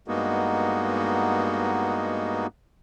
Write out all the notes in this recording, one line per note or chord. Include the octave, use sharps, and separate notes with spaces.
G2 G#3 A#3 B3 D#4 F#4